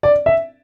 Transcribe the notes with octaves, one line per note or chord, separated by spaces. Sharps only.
D5
E5